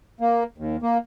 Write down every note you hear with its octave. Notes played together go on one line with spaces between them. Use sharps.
A#3
D#2
A#3